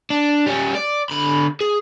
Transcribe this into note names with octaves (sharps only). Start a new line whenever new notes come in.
D4
G3 C#4
D5
D3 B5
G#4